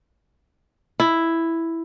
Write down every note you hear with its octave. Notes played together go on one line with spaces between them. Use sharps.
E4